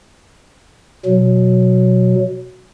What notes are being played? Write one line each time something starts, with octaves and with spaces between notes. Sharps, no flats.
B2 F#3